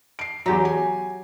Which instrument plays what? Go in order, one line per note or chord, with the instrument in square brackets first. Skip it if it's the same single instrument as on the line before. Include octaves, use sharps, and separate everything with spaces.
[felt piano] C7 D7
[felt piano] E2 A#5 [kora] F#3 G4
[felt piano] G#5